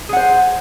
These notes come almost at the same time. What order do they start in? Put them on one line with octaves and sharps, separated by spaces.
G#4 F#5 C5